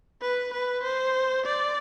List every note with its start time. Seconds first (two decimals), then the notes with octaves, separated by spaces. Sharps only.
0.21 B4
0.53 B4
0.83 C5
1.46 D5